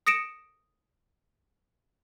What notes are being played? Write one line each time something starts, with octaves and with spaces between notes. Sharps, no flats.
D#6 A#6 C#7 D7 E7